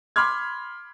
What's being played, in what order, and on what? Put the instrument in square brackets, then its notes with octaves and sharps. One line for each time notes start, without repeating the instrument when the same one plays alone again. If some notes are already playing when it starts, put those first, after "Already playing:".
[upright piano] B5 C6 D6 F6 G#6